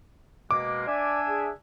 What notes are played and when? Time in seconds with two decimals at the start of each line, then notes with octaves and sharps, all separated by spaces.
0.51 B2 G#3 A#3 D6
0.87 D4 D5 E5 G#5
1.29 G#4